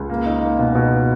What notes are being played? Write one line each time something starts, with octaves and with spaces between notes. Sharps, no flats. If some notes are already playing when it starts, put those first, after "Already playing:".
Already playing: C#2
A#3
D#4
A#3
B2
B2